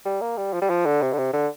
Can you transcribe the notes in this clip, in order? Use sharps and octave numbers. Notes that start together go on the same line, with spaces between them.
G3
A#3
G3
F3
G3
F3
D3
C3
D3
C3
D3